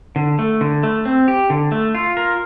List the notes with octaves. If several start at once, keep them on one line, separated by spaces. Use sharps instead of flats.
D3
A3
D3
A3
C4
G4
D3
A3
F4
A#4